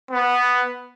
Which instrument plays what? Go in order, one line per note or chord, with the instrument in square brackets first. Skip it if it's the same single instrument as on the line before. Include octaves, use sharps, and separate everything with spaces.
[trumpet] B3